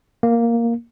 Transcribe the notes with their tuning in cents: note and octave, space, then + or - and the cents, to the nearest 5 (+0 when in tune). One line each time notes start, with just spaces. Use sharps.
A#3 +0